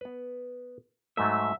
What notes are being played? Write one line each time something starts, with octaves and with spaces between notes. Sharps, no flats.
B3 B4
G#2 F#3 A3 E5